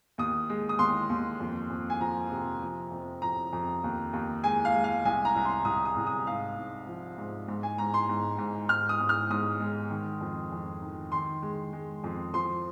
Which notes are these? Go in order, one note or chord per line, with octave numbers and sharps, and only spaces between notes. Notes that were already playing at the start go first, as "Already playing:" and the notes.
D#2 D#6
G#3
D#6
D#2 C6
D#2
F2
F2
G#5
F3 A#5
C3
F3
F2
F2 A#5
F2
D#2
D#2
G#3 G#5
F5
G#3
F5
C2 G#5
A#5
C2
C6
C2 D#6
D#6
C2
D#6
G#2 F5
G#2
F3
G#2
G#2
G#5
G#2 A#5
C6
G#2
G#2
G#2 F6
D#6
G#2
F6
G#2 D#6
G#3
D#3
F2
F2
D#3
D#3 C6
G#3
G#3
F2
F3 C6